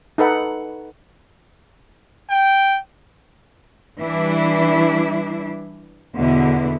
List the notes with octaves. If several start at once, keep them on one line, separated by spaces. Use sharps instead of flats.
D#4 A4 B4 F#5
G5
E3 G3 D4 E4
E2 B2 D3 B3 E4